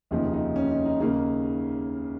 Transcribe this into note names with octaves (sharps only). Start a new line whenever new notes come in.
F1 D#2 C#3 F3 D#4 G#4
D#4
C#4
D#4
D#4
D#2 C#3 A#3 D#4 G#4